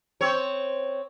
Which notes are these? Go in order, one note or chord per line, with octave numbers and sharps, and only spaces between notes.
C4 C#5